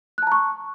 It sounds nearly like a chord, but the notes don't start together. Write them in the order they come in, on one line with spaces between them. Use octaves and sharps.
F#6 A5 A#5 C#6